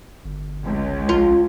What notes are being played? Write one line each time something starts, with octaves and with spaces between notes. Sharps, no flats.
G1
C#2
A#1 F4